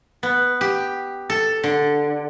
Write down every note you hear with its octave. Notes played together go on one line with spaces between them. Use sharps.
B3
G4
A4
D3